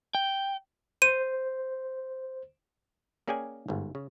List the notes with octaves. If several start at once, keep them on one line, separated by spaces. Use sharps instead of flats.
G5
C5 D#7
A#3 C#4 G#4 D5 G5 G#5
G1 G#2
C#3